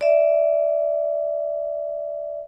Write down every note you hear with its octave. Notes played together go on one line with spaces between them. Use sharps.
D5 E5